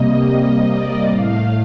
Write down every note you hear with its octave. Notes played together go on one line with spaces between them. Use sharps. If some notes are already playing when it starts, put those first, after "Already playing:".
Already playing: C3 G3 A#3 D#5
D#5
D5
A2 A3 F5